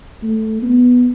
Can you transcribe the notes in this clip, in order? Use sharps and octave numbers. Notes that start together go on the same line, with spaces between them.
A3
B3